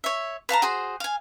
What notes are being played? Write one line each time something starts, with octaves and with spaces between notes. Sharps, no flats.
C#5 E5
B4 F5 A5 A#5
F#4 G#4 C5
F5 G#5